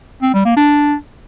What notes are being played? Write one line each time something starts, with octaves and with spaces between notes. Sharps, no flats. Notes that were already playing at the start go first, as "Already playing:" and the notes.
C4
G3
A#3
D4